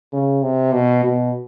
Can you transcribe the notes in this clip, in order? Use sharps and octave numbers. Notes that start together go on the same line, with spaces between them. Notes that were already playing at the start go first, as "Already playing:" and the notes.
C#3
C3
B2
B2